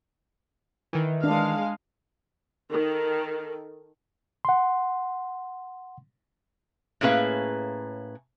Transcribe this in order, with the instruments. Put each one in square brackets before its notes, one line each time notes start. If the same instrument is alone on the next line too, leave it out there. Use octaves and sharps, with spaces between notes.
[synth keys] D#3 E3
[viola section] G#3 F5 [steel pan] D4
[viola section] D#3 A4 [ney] A#4
[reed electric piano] F#5 C6
[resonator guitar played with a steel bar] A2 A#3 C#4 G#4 B4 F5